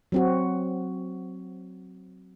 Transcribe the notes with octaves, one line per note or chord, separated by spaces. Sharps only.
F#3 C4 F#4